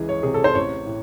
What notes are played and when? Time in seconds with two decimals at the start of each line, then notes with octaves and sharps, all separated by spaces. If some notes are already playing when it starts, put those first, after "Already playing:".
Already playing: C#2 E3 G#4
0.09 C#5
0.23 C3 G#4
0.34 A4
0.44 C5
0.55 A1 C#5
0.86 A2